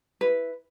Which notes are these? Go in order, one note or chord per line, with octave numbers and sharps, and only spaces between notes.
E4 B4